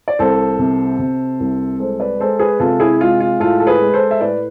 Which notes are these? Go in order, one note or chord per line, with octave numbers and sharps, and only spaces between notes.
D5
C2 A4 C5
C3
C3
C2
G#3 A4 C5
B4 D5
G#3 A4 C5
G#4 B4
C3 F4 A4
E4 G#4
G#3 F4
F4
A2 F4 A4
A4
G#4 B4
G#3
A4 C5
E5
A2 B4 D5